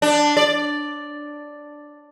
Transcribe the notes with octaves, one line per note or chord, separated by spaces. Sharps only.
D4
D5